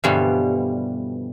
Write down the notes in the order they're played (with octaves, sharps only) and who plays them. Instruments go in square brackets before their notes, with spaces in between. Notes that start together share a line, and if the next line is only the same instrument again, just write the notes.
[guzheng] G2 B2 D3 E3 F3 G3